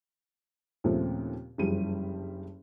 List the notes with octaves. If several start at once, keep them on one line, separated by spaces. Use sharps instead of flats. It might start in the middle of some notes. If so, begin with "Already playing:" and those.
D#2 A#2 C#3 F3 A3 C4
F#1 G2 F3 G3 G#4 D#7